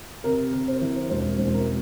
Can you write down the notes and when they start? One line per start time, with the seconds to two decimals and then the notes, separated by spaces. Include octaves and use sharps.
0.24 C3 A#4
0.53 C3
0.68 C5
0.81 E3
1.10 E1 C5
1.38 E1
1.54 A#4